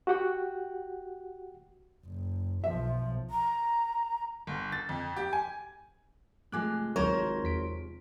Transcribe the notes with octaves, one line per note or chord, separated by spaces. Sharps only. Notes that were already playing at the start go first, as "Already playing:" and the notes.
F#4 G4 F#5 G5
F#1
B1 F3 E5
A#5
G1
A6
F2
G4
G#5
C3 F3 G#3 A3 G#5 D6 F#6
G#1 D2 F#3 A#4 C5 C#5
E2 B6 D7